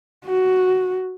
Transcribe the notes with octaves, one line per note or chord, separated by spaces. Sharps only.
F#4